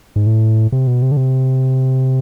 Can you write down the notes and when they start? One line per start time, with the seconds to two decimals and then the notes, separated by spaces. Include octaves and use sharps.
0.16 G#2
0.26 A2
0.72 C3
0.87 B2
1.02 C3
1.12 D3
1.17 C3